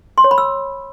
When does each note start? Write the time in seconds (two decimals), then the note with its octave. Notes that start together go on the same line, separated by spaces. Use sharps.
0.18 C6
0.24 C#5
0.31 B5
0.38 E6